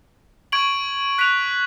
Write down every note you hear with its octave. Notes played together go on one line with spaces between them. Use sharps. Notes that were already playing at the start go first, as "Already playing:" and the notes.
C#6 G#6 D7 F#7
F#6 B6 D7 F7